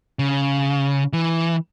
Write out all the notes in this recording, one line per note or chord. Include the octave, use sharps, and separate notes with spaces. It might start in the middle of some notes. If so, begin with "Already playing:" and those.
C#3
E3